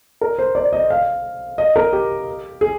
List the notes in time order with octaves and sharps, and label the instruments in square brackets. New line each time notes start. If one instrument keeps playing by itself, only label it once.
[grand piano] A#4
C5
D5
D#5
F5
D#5
A#4
G4
G#4